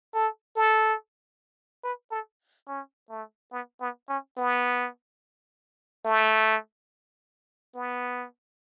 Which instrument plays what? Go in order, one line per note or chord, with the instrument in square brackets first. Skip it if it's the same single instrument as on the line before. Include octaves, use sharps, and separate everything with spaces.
[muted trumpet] A4
A4
B4
A4
C#4
A3
B3
B3
C#4
B3
A3
B3